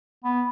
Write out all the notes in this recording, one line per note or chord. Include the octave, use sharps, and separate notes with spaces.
B3